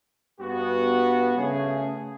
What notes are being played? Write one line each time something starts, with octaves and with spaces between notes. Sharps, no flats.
G2 B3 F#4
C#3 A3 C#4 G#4